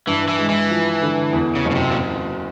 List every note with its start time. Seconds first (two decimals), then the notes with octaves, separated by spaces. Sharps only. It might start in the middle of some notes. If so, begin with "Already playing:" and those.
0.07 G2 E3
0.28 E3
0.39 G#3
0.49 E3
0.70 F3
1.02 D3
1.33 E2
1.55 C#3
1.66 F#1
1.71 C#3
1.75 C3
1.91 A#2